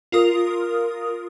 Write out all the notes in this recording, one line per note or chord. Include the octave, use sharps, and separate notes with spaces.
F4 A#4 D#6